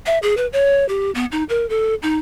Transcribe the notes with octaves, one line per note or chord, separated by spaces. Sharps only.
E5
G#4
B4
C#5
G4
B3
D#4
A#4
A4
D#4